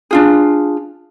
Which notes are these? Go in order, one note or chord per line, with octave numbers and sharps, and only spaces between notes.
D4 F4 G#4